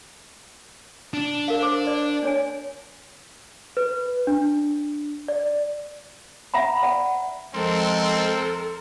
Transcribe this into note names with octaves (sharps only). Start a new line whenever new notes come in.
D4
A#4 F5
C5 D6
D5
D4 C#5 G#5
B4
D4
D5
E5 F#5 A#5 B5
D5 F#5
F2 F3 G#3 C4 A4 A#4 C6